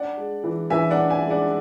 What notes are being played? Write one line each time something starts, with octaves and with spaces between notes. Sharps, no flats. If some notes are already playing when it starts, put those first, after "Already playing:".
Already playing: D4 D5 F#5
G#3
E3
E3 E5 G#5
D5 F#5
D4
E5 G#5
G#3
D5 F#5